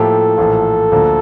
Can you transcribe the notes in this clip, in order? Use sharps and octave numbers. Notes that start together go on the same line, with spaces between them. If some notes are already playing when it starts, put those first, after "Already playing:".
Already playing: A2 F3 A#3 E4 G4 A4
A#1 A2 E3 A#3 F4
D2 D3 F3 A#3